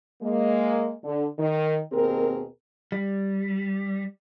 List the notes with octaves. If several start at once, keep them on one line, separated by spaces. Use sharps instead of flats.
G#3 A#3
D3
D#3
D#2 B2 C4 G#4 A#4
G3